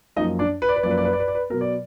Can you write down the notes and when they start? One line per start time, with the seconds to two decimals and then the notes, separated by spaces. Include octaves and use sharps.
0.16 F#2 F3 A#3 D#4 D#5
0.39 D4 D5
0.62 B4
0.69 D5
0.76 B4
0.83 F#2 F3 A#3 D5
0.91 B4
0.98 D5
1.05 B4
1.13 D5
1.20 B4
1.28 D5
1.35 B4
1.50 B2 F#3 B3 A#4
1.61 D5